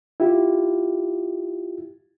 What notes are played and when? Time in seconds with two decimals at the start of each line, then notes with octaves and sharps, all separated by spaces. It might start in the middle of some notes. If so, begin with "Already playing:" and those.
0.20 E4 F4 G4